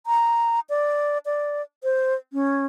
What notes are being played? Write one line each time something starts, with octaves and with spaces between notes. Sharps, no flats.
A#5
D5
D5
C5
C#4